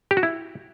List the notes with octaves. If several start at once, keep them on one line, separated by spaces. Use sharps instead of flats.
G4
F#4
E4